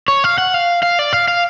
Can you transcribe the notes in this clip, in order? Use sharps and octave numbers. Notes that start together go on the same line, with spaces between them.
C#5
F5
F#5
F5
F5
D5
F5
F5